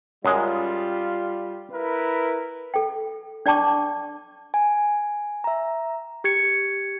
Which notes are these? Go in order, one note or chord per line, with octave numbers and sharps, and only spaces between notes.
F#2 G3 G#3 F4
E4 A#4 B4
A4 G5
D4 D5 G5 A5 C#6 D6
G#5
E5 A#5
G4 G#6 C#7